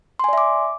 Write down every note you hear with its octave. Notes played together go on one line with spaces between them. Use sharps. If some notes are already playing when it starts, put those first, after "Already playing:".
D5 E5 G#5 C6 D6